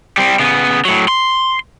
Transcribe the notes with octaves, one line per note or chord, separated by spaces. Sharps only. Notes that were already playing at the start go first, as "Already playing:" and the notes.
G3 C4
C#3 B3
A2 F#3
C6